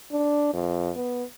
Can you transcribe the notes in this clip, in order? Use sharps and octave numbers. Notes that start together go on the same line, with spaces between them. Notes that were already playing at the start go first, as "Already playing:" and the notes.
D4
F2
B3